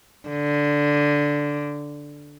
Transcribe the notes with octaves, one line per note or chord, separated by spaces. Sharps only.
D3